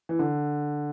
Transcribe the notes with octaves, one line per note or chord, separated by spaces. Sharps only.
E3
D3